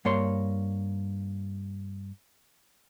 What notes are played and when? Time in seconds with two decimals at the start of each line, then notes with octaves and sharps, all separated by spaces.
0.05 G2 A#3 C#5 C6